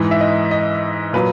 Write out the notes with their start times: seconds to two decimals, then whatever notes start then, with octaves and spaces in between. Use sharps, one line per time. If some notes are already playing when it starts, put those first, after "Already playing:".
Already playing: G#2 E3
0.11 E5
0.21 D#5
0.51 D#5
1.13 A#2 F#3 B4